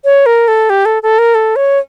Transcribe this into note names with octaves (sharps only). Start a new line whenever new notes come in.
C#5
A#4
A4
G4
A4
A4
A#4
A4
C#5